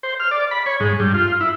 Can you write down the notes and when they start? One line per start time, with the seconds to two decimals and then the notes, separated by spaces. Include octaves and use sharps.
0.03 C5
0.20 F6
0.31 D5
0.51 B5
0.66 C#5
0.80 G#2
1.00 G2
1.14 F4
1.41 E4